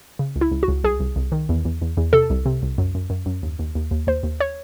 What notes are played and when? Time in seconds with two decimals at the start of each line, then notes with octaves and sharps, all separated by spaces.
0.19 C#3
0.36 C#2
0.41 E4
0.51 C#2
0.63 F#4
0.68 C#2
0.84 C2 G#4
1.00 C2
1.16 C2
1.32 D#3
1.49 E2
1.65 E2
1.82 E2
1.97 E2
2.13 C3 A4
2.30 C2
2.46 C3
2.62 C2
2.78 F#2
2.95 F#2
3.10 F#2
3.26 F#2
3.43 D#2
3.59 D#2
3.75 D#2
3.91 D#2
4.07 D#2 C5
4.23 D#2
4.40 C#5